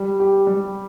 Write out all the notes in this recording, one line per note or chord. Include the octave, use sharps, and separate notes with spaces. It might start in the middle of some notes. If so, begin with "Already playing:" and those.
Already playing: G3
G4
G3